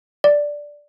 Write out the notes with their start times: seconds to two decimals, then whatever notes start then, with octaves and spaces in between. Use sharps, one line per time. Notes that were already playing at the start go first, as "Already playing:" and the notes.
0.24 D5